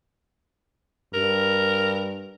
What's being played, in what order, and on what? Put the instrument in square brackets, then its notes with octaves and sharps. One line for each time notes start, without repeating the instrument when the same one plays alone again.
[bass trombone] G2 [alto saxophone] A#4